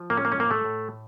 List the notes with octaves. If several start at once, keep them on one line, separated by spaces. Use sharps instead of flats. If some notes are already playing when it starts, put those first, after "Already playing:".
Already playing: F3
A2 A#3
C#4
A#3
C#4
A2 A#3
A3
A2